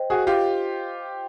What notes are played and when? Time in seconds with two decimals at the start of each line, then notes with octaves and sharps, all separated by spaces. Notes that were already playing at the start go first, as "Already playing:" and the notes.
Already playing: C5 D#5 G5
0.10 F#4 G#4
0.27 F4 G4